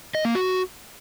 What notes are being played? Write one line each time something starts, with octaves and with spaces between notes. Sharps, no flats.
D#5
A#3
F#4